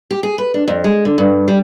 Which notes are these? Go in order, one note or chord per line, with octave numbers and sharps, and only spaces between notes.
G4
G#4
B4
D4
F2
G#3
D3
G2
G3